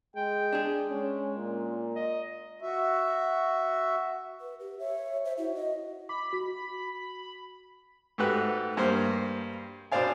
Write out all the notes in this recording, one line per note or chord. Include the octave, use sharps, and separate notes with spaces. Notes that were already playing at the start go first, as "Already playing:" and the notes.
G#3 G5
D4 G#4
G#3 C#4
A#2
D#5
F#4 E5
B4
G4
C#5 E5
C5 E5
E4 F#4
D#5
B5 D6
F#4 B6
G#2 A3 F#4 G4 B4 F#6
G2 A#3 C5 F6
B2 D4 C5 D5 F5 G#5